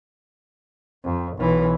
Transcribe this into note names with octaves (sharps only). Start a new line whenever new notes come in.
F2
B1 E3